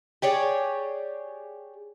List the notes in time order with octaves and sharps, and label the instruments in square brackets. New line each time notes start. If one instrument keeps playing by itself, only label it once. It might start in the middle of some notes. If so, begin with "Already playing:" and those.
[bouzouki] G4 G#4 C#5 D5